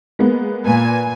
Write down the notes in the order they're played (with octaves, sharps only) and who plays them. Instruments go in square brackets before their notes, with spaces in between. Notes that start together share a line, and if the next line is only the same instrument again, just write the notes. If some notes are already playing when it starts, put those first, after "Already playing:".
[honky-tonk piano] G#3 A#3 B3
[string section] A#2 G#5 [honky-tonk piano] B4